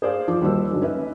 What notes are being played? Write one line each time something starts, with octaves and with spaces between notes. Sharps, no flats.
G#4 C5 D5 F5
F3 F4 D6
D#1 D#3 G3 F#4 C5 E6
D3 F#3 G#3
C#4 D#4 B4 E5